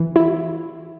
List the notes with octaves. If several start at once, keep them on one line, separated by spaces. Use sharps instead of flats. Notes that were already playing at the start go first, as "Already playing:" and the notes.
Already playing: E3
E4